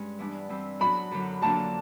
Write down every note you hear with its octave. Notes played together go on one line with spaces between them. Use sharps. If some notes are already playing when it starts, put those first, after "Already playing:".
Already playing: G2 G#3 C#4
E3 G3 B3 D4
E3 G3 C4 E4
F#3 B3 D4 F#4 B5
F#2 D3 F#3
F2 D3 F#3 A#3 D4 A5